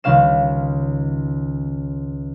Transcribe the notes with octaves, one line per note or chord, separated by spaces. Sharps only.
C#2 D#3 G3 C#4 F5 E7